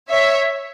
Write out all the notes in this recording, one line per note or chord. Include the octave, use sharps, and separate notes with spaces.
C#5 E5